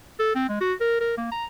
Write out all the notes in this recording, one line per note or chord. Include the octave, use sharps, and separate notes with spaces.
A4
C4
G#3
F#4
A#4
A#4
A#3
A#5